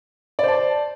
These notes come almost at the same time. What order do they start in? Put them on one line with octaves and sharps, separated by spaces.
D5 C5 A5